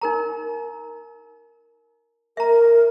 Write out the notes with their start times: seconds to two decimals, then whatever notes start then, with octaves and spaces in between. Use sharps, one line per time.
0.01 D#4 A#4 A#5
2.37 A#4 E5 A#5